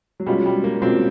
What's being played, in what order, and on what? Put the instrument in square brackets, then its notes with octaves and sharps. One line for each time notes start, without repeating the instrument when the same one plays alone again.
[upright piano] F#3
[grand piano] B2 G#3 C#4 F4 [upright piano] G3
[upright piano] G3
A#3
[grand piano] B2 G#3 C#4 F4 [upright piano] C4